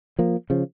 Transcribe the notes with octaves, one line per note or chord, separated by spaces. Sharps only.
F3 A#3
C#3 F3